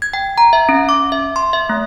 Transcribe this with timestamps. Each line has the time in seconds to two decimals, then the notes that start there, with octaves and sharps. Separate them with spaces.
0.02 G#6
0.13 G5
0.38 A#5
0.53 E5
0.69 C#4
0.89 D6
1.12 E5
1.36 C6
1.53 E5
1.69 A3